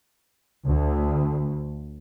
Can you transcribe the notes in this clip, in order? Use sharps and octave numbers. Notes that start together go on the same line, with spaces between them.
D2